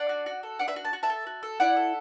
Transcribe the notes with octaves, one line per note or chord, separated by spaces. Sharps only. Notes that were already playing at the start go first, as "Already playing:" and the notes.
Already playing: D4 D5 F#5
F#4
F#4
A4
D4 D5 F#5
B4 E5
F#4
A5
F#4
E5 A5
A4
F#4
A4
E4 D5 F#5
A4